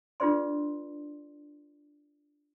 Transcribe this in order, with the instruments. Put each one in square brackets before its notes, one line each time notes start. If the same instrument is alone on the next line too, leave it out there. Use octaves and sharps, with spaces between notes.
[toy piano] D4 F4 G#4 B4 D5 C6